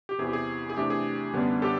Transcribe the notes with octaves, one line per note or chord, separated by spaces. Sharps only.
G4
E2 C3 E3 G#4
G4
G#4
G#4
C3 E3 A3 D4 G4
G#4
F#2 D3 G3 B3 D4
G4 A4